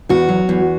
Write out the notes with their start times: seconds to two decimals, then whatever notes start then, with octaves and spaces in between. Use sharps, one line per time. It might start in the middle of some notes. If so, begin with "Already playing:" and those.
0.09 E2 F#4
0.29 F#3
0.49 E2